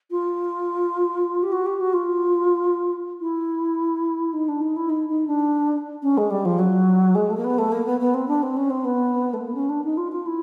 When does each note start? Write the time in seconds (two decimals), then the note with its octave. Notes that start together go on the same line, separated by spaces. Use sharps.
0.10 F4
1.42 G4
1.52 F#4
1.66 G4
1.80 F#4
1.93 F4
3.20 E4
4.33 D#4
4.48 D4
4.61 D#4
4.76 E4
4.89 D#4
5.09 D#4
5.27 D4
6.02 C#4
6.17 G#3
6.30 G3
6.45 F3
6.58 F#3
7.15 G#3
7.30 A3
7.37 A#3
7.44 B3
7.58 A3
7.72 A#3
7.86 B3
8.00 B3
8.14 C4
8.27 D4
8.42 C4
8.56 C#4
8.70 C4
8.84 B3
9.33 A3
9.40 A#3
9.54 C#4
9.69 D4
9.84 D#4
9.97 F4
10.11 F4
10.26 E4